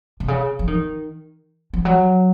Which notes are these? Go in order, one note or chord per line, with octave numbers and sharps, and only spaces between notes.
C3
C#3
F3
D#3
F3
F#3